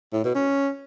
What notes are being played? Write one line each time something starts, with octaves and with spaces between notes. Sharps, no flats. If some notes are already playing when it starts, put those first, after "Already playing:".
A2
B2
C#4